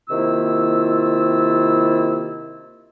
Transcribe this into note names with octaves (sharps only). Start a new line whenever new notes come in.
C3 D#3 A#3 E4 F4 E6